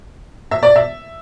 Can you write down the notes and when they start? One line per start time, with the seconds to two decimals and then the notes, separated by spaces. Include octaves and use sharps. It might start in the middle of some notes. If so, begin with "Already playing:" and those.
0.51 E5
0.63 D5
0.76 E5